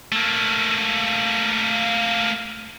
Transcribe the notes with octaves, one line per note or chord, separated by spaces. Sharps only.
A3 A#3